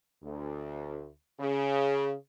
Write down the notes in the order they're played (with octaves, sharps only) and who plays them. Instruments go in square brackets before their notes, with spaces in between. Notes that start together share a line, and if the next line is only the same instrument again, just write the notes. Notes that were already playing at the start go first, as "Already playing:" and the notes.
[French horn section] D2
C#3